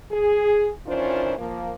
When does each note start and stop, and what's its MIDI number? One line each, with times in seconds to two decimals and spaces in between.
0.11 0.70 68
0.87 1.34 51
0.87 1.34 52
0.87 1.34 61
0.87 1.34 62
0.87 1.34 65
0.87 1.34 72
1.38 1.73 53
1.38 1.73 58